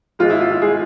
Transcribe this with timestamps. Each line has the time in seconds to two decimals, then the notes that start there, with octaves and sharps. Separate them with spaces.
0.19 G#1 G#2 G#3 F4
0.30 E4
0.40 F4
0.51 F4
0.62 G#3 G#4